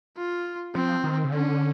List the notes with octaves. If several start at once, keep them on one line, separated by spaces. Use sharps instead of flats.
F4
F3 C4
D#3
C#3
D3 C#4